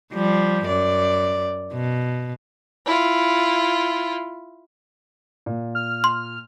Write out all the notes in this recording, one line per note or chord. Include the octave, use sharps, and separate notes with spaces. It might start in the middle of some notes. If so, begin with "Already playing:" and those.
F3 G3
F#2 D5
B2
E4 F4
A#2
F6
C6